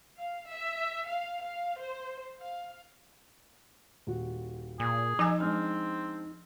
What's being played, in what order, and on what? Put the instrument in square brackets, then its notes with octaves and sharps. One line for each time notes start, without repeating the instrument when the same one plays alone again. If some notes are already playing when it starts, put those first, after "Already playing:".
[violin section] F5
E5
F5
F5
C5
F5
[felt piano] D#1 F#4
[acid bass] A#2 [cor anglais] G#4
[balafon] F3 G#5 [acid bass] D#4 [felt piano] E6 G#6
[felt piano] G#3 D4 F6 [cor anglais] C4